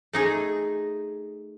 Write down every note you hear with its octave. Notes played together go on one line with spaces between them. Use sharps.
A3 D#4 G#4